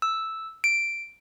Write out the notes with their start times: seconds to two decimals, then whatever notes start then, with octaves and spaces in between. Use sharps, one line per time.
0.02 E6
0.64 D7